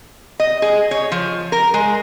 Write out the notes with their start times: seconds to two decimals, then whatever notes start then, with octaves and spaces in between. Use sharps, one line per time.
0.40 D#5
0.62 G#4
0.91 C#5
1.12 F3
1.52 A#4
1.74 G#3